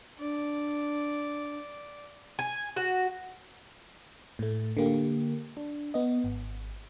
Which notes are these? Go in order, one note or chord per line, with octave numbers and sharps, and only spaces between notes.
D4 D5
G#5
F#4
A2 A3
D3 A#3 G4
D4
B3 D#5
G#1